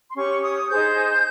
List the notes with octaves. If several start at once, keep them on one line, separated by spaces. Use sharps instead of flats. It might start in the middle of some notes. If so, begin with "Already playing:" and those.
C6
C#4 G4 C#5 C#6
D#6
D#4 G#4 C5 G6